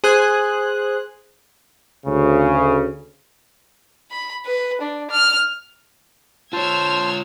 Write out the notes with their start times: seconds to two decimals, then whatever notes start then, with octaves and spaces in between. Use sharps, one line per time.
0.04 G#4 C5 F#6
2.06 D2 C#3
4.11 B5
4.46 B4
4.81 D4
5.11 F6
6.53 F4 C5 C#5 A5 E6 F6 G#6